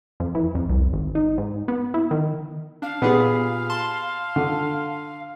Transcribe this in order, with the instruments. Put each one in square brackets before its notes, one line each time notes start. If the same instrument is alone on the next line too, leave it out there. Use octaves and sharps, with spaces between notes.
[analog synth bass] F2
E3
F2
C2
G#1
D#4
G#2
B3
E4
D#3
[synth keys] D4 [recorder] F5
[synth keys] A#2 G4 G#4 [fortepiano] B3
[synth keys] A5 C6
[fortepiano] D3